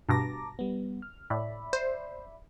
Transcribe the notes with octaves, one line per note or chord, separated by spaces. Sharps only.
G2 B2 A5 A#5 D6 A#6
G3 B3
F6
A2 D5 E5 B5
C5